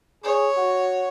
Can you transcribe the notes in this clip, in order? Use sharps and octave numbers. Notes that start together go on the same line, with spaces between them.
G#4 C#5
F#4